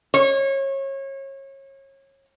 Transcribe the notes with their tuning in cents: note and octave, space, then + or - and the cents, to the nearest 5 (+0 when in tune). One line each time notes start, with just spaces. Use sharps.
C#5 -30